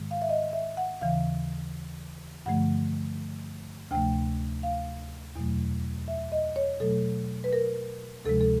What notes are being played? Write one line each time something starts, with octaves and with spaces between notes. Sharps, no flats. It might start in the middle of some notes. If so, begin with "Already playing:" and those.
Already playing: G#2 D#3 G#3
F5
E5
D#5
E5
F#5
D#2 C#3 E3 F5
G2 D3 F3 A3 F#5
D2 C3 F3 A3 G5
F5
E2 B2 F#3 A3
E5
D#5
C#5
B2 F#3 A3 A4
B4
A#4
D2 C3 F3 G#3 A4
A4